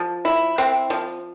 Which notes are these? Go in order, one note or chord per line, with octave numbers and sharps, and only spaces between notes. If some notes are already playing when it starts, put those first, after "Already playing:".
Already playing: F3
E4
C4
F3